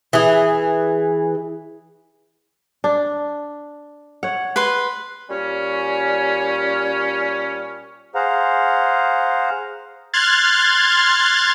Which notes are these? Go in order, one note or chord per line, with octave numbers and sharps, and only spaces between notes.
E3 G#4
D4
C#5 F#5
B4 C6
A#2 G3 C#4
G#4 C5 F5 F#5 A#5
C6 F6 F#6 G#6 A6